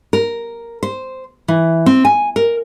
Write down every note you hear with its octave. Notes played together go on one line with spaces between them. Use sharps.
A#4
C5
E3
C4
G#5
A#4